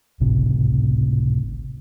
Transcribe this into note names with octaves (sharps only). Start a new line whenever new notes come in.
G#1 C#2 A2 C3